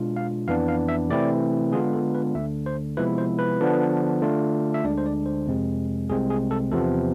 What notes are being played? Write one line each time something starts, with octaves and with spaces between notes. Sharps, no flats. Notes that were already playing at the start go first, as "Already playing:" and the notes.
Already playing: B2 G#3 D4 F4
F5
F2 E3 B3 D4 F5
F5
E5
C3 E3 A3 C4 E4 D5
D3 G#3 B3 D4 F4 G#4
A4
B4
D2 D3 A3 E5
C5
C3 F3 G#3 B3 E4 B4
C5
B4
D3 F3 B3 D4
D3 A3 D4 F4
E5
D2 D3 G#3 D4 D5
C5
D5
C5
F2 C3 G#3 C4
C2 C3 G#3 C4 G#4
G#4
A4
E2 C3 F3 B3 A4